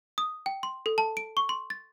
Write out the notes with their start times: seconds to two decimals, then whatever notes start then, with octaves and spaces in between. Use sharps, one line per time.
0.18 D#6
0.46 G5
0.63 C6
0.86 A4
0.98 A5
1.17 D7
1.37 C#6
1.49 C6
1.70 A6